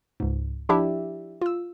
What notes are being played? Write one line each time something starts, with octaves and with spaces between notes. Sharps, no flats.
C#2 G#2
F3 D4 E4 G4 D5 E5
F4 E6